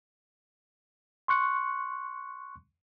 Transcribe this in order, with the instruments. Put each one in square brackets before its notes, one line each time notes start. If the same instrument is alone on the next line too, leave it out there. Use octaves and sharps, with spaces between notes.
[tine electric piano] C6 C#6 F#6 C#7